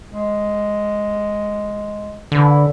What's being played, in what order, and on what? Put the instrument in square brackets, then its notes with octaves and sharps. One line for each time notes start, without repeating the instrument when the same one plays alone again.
[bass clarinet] G#3
[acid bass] D3 [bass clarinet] E3